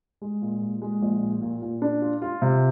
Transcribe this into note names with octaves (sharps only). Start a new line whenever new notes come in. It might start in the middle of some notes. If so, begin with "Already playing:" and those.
G#3
A#2
A#2
G#3
A#1
A#2
A#2
A#2
D4
F4
F4
C3